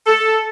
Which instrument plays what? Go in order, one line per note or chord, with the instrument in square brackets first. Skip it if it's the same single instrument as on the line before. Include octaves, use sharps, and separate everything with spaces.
[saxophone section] A4